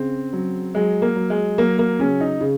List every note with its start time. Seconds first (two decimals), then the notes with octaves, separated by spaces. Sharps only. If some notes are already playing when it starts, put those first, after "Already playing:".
Already playing: C#3 C4
0.33 F#3
0.75 F#3 G#3
1.02 A#3
1.16 F#3
1.30 G#3
1.58 F#3 A#3
1.79 A#3
2.00 C#3 C#4
2.21 D#4
2.41 C#3